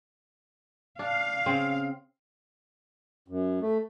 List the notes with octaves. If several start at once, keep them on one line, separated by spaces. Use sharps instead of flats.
D4 F5
C#3 C4
F#2
A3